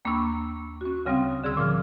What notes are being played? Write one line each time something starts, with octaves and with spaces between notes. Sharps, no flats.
D#2 A#3 D4 B5 C#6 E6
C#4 F#4
D2 C#3 G3 C4 F5 D#6
D3 G#4 C6 E6
A#2 F3 D6 F6